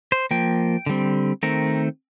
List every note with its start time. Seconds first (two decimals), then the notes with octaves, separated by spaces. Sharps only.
0.12 C5
0.31 F3 A#3 G5
0.86 D3 G3 C4
1.43 D#3 A3 C4 A#4